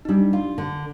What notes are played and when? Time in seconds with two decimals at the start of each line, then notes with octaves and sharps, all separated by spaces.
0.05 D#4
0.08 G3 D4
0.33 F4
0.58 D3